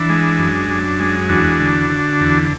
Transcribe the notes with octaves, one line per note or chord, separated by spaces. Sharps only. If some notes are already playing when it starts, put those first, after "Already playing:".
Already playing: E3 D4
G#3
F#2
F#2
G#3
E2 D4 F#4
D3
D3
E2